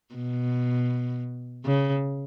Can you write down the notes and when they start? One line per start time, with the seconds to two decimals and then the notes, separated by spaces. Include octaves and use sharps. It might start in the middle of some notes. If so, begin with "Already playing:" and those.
0.14 B2
1.65 C#3